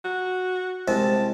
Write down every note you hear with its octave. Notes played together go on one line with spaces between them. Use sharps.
F#4
C2 G#3 C4 A5